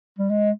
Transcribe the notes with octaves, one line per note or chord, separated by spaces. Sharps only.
G3
G#3